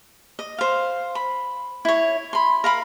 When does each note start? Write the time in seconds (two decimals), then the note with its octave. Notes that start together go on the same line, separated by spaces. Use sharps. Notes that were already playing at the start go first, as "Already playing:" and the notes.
0.39 D#5
0.58 C5 F5
1.15 B5
1.85 E4 C#5
2.33 B5 C6
2.64 A#4 F5 B5